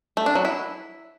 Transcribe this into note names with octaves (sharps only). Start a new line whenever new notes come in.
A3
D4
F#3
E4